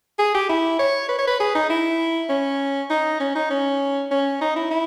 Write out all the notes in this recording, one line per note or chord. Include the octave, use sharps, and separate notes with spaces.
G#4
G4
E4
C#5
B4
C#5
B4
G#4
D#4
E4
C#4
D#4
C#4
D#4
C#4
C#4
D#4
E4
E4